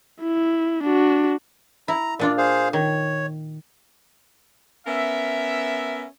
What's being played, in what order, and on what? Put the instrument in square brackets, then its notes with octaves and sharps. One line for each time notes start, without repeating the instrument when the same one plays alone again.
[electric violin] E4
D4 F#4
[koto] E4 [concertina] A#5
[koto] A#2 D4 F4 [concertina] D5
[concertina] G#4 C5 F5
[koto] D#3 [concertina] C#5
[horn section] B3 C#4 A#4 E5